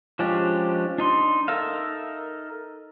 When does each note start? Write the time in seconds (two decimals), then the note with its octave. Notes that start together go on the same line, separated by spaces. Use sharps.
0.19 F3 G#3 C#4 D4 G4
0.98 D4 D#4 C6
1.48 D#4 A4 A#4 E5 F5